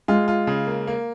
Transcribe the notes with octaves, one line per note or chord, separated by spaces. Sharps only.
G#3 F4
F4
C#3
A#3
A#3